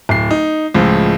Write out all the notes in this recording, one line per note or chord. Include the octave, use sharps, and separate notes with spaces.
D1 C7
D#4
C#2 A2 F3 G#3